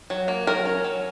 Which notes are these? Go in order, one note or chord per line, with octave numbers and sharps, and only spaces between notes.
F#3
A#3
F#3 A#4
C#4
F#3